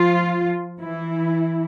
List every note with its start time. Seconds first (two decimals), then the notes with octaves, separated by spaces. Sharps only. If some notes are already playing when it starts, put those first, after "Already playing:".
Already playing: F3 F4
0.81 E3 E4